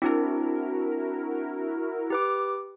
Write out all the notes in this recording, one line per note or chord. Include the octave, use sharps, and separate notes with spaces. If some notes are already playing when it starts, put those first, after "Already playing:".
C4 D4 E4 F#4 A#4
G4 B4 D6